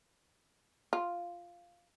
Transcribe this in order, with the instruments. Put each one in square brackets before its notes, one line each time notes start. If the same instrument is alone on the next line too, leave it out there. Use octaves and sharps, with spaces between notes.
[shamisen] F4